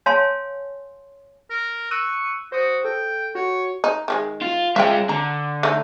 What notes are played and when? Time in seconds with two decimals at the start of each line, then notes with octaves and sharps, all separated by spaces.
0.06 C#5 F5 G#5 A5 C6
1.50 A#4
1.91 C#6 E6 F#6 D#7
2.52 F#4 C5 D#6
2.85 A4 G5
3.35 F#4 C#5
3.84 D#4
4.08 D#3 F3 G#3
4.41 F4
4.76 G#3 F4 E5 F5 G5
5.09 D3 A#5
5.63 A3 D#4